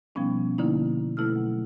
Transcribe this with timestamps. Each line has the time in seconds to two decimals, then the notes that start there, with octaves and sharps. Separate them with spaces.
0.15 B2 F3 G3 B3 C#4 D#4
0.58 B2 D3 F3 A#3 D#4 E4
1.17 B2 A3 E4 A4 E6 F6
1.36 F#3